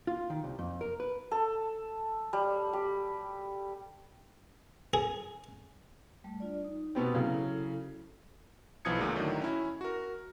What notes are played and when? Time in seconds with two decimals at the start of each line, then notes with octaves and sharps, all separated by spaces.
0.07 F4
0.30 D#3
0.44 C2
0.59 F2
0.81 A#4
1.00 B4
1.31 A4
2.33 G3
2.73 G4
4.94 G#4
6.24 G3 A3
6.40 D4 F4 D5
6.65 D#4
6.95 B2 B3 C4 G4 G5
7.14 C#3 F#3 E4 A4
8.85 B1 E3 F3 D#6 G#6 C#7
8.98 D2 A#2 D3 F#3 G#3
9.15 A2 D3 D#3 F#3 D#4
9.42 C#4 E4
9.81 F#4 A#4